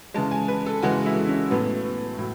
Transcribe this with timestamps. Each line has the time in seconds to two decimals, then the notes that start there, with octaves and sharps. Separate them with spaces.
0.14 C#3 E3 G#3 A5
0.31 G#5
0.48 B4
0.66 A4
0.83 C#3 E3 G#3 F#4
1.06 E4
1.28 C#4
1.50 A2 F#3 B3
2.18 A2 F#3